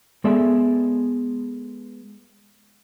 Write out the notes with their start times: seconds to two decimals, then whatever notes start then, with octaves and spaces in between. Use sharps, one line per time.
0.24 G#3 B3 G#4 A4 D5 E5